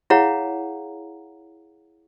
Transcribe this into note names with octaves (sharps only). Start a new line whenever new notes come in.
E4 G#4 C#5 F5 F#5 A#5